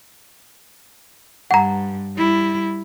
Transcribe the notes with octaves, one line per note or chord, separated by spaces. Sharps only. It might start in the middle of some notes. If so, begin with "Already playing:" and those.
G2 F#5 A#5
G3 E4